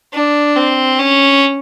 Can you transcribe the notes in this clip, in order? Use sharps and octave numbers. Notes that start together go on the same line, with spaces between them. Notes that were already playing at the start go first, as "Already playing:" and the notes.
D4
C4
C#4